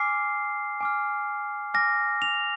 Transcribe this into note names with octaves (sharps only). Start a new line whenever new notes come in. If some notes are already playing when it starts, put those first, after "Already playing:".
Already playing: G#5 D6 F6 C7
G#5 D6 F6
G#5 D6 F6 A#6
F7